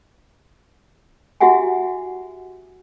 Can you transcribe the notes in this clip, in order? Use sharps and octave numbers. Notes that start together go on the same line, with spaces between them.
E4 F#4 G4 E5 F#5 G#5